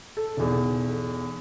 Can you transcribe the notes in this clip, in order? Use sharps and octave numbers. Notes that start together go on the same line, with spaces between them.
A4
B1 E2